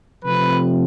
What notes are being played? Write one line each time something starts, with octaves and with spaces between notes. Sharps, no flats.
C3 F3 A3 C4 B4